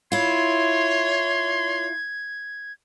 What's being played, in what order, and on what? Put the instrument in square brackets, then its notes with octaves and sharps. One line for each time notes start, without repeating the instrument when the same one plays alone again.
[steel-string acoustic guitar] E4 F4 [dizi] C#5 [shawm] C6 [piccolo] G#6